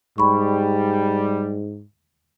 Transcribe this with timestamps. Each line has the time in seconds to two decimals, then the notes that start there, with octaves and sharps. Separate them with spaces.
0.18 G#2 G3 B5 C#6